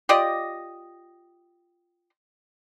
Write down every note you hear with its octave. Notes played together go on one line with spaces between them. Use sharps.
F4 G4 D5 D#5